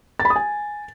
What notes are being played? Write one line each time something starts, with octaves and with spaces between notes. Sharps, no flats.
A6
B5
D#6
G#5